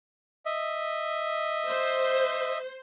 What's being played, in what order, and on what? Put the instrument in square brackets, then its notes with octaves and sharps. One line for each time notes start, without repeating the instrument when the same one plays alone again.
[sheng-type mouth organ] D#5 E5
[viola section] C5